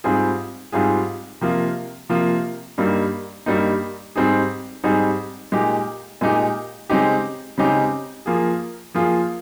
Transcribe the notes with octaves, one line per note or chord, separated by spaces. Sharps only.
G#2 G3 C4 F4 G#4
G#2 G3 C4 F4 G#4
C3 F3 A#3 F4
C3 F3 A#3 F4
G2 G3 A#3 D#4
G2 G3 A#3 D#4
G#2 G3 C4 D#4 G#4
G#2 G3 C4 D#4 G#4
A#2 G#3 D#4 G4
A#2 G#3 D#4 G4
C#3 G#3 C4 D#4 G4
C#3 G#3 C4 D#4 G4
F3 A#3 F4 G#4
F3 A#3 F4 G#4